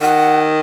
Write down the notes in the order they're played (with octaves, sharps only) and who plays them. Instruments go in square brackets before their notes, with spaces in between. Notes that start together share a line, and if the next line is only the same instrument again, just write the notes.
[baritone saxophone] D#3 [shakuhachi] F#5